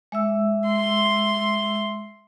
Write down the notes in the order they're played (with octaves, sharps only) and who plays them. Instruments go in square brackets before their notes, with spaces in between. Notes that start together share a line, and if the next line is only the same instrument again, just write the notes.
[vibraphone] G#3 E5 E6
[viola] C6